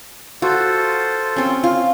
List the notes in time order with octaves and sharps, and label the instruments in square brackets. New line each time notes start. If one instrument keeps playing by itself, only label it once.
[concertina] F4 A4 C5 [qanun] F#4
[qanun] C4 C#4
F4